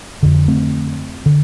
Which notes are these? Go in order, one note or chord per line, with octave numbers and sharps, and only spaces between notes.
F2 D3
A3 C4
D3